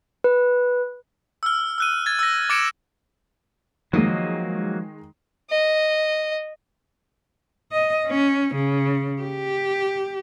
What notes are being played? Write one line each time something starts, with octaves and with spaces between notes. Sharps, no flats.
B4
E6 F6
E6 F#6 D#7
G#6 A6
E6 A#6
D6 G#6 A6 C#7 D7 E7
D#3 F3 F#3 G#3 A#3 D#5
D#5
D#5
C#4
C#3
G4